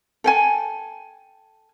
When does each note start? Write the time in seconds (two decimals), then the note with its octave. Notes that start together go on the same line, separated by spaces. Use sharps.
0.24 A4 G5 G#5